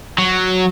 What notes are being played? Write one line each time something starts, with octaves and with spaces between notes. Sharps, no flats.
F#3